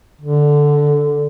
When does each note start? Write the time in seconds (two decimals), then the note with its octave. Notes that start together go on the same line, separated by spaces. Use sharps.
0.21 D3